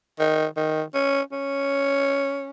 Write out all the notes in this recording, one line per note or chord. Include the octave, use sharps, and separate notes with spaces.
D#3
D#3
C#4
C#4